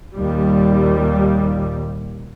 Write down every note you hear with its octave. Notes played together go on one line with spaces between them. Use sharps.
D#2 A#2 G3